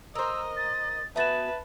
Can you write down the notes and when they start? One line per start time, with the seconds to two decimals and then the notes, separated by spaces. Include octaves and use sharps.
0.15 A#4 C5 D#5 E6
0.57 A6
1.16 B3 F#4 B4 E5 G#5 A5 A6 E7